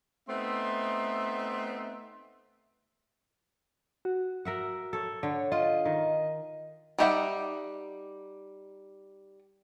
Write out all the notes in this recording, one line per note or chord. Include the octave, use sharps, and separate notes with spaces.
A3 B3 C4 D#4 E5 C6
F#4
A#4 E5 F#5
A4 C#5
D3 C#5
F4 D#5
D#3
G3 D#4 G4 E5 F#5